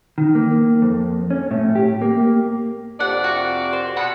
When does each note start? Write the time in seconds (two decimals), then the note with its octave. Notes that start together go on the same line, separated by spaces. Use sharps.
0.18 D#3
0.35 A#3
0.82 F2
1.30 C#4
1.51 A2
1.75 G4
2.02 A#3
3.00 F2 C3 D5 F#5
3.24 F#4
3.73 C5
3.97 B2 F#5 B5